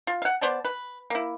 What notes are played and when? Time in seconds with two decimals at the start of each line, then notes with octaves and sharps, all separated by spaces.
0.07 F4
0.22 F5 F#5
0.41 B3 C5 D5 A5
0.65 B4
1.10 A#3 E4